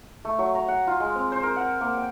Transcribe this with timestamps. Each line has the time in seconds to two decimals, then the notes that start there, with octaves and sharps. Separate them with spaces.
0.25 A3
0.39 F#3
0.55 A#5
0.68 F#5
0.87 F4
1.00 G#3
1.15 C4
1.32 C5
1.43 A#4
1.56 F#5
1.81 A#3
1.98 G5